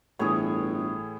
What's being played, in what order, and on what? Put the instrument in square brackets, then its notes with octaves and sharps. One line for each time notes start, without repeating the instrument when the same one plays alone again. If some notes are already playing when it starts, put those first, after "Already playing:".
[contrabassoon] G1 [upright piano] A2 E3 [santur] G#4 C#5